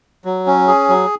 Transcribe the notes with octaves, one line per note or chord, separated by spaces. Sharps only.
F#3
C#4
G#4
F#3